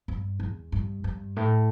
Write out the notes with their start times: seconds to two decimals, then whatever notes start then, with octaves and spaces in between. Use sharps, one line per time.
0.08 G2
0.40 E2
0.72 G2
1.04 G2
1.36 A2